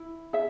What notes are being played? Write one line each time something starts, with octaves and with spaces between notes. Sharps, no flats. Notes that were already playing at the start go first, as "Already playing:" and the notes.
Already playing: E4
G#4 E5